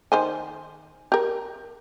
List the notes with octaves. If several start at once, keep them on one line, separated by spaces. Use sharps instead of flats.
D#3 C5 G#5
G4 A#4